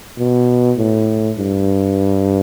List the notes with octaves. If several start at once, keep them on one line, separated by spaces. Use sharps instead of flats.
B2
A2
G2